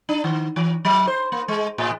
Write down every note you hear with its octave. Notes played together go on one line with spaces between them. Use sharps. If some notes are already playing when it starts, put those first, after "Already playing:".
D4
D#3
E3
F#3
C5
A#3
G#3
A2